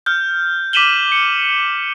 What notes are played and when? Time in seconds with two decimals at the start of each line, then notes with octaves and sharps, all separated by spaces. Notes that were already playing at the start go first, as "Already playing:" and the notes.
0.06 F6 G6
0.73 D6 B6 D#7 E7 F#7 G7
1.12 C#7